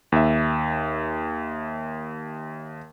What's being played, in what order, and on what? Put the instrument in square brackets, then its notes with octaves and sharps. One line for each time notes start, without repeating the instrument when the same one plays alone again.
[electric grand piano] D#2 E5